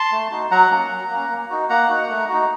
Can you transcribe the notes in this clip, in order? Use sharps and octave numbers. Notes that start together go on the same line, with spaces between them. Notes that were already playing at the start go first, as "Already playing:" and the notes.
Already playing: A5 C6
A3
D#4 F#4
F#3 F#5 A#5
A#3 C#4
F#3
A#3 C#4
A#3
D#4 F#4
A#3 F#5 A#5
D#4 F#4
A3
D#4 F#4